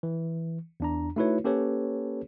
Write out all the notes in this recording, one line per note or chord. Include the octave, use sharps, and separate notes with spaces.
E3
E2 D4 A#5
A3 D#4 E4 F#4 B4 C#5
A#3 C#4 G4 A4 B4 C#5